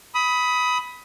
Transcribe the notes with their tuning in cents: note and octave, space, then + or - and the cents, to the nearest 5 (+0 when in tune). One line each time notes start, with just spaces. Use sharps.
B5 +0 D#6 +25